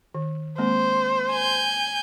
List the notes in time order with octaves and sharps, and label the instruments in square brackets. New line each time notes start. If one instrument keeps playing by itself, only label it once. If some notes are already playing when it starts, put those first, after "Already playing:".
[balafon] D#3
[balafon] G#3 A#3 C4 [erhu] C5
[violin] G#5 G6